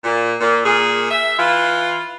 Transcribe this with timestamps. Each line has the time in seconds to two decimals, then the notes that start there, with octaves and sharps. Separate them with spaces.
0.02 A#2
0.41 A#2
0.64 A#2 G#4
1.11 E5
1.38 E3 F4